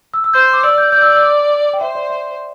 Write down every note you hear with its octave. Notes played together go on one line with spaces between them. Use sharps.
E6
E6
C5 G6
D6
D5 E6
G6
D5 G6
E6
E6
D6
G5
C5 E5
D5
E5